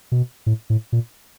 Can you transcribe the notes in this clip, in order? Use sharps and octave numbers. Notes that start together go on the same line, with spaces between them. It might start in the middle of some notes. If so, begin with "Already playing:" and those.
B2
A2
A2
A#2